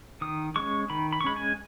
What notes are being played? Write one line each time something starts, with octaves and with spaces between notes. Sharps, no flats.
D#3 D#6
G#3 C#4 C#6
D#3 B5
B5
C#6
G#3 C#4 B5
G#5